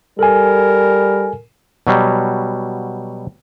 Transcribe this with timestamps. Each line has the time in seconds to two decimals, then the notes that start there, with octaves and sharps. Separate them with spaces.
0.19 G3 A4 A#4 G#5
1.87 B2 F#3 G3